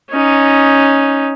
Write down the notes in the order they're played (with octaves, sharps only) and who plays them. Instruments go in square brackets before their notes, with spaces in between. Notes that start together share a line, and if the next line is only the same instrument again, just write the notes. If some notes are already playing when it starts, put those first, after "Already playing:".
[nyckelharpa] C#4 D#4